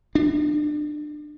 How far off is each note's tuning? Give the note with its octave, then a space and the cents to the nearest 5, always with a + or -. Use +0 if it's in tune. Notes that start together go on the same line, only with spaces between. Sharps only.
D4 +30